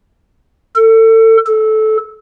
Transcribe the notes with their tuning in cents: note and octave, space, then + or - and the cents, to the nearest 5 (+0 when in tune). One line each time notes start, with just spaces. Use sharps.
A4 +30
A4 -15